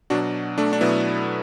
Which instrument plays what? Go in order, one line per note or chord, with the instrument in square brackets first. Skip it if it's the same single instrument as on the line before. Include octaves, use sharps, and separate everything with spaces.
[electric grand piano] B2 F#3 D4 F#4
A3 D4
D4
B2 F#3 B3 E4